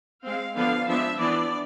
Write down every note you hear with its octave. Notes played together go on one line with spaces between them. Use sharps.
G#3 C4 F5
D3 F3 B3 D4 F5
F3 G#3 B3 D4 E5
E3 B3 D4 D5